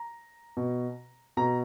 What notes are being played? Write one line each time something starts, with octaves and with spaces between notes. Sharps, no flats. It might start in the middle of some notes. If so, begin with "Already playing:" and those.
Already playing: A#5
B2
B2 A#5